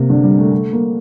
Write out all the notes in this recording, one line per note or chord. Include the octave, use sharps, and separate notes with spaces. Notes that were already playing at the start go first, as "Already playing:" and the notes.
Already playing: C3 A#3
D3
G3
A3
A3
A#3